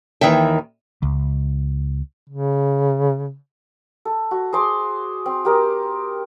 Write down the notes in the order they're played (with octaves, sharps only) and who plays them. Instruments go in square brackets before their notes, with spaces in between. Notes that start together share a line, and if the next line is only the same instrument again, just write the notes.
[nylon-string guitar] D#2 D#3 E3 E5 G5
[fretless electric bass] C#2
[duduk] C#3
[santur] A4
F#4
G#4 C5 C6 D6
C4
G4 A#4 D#5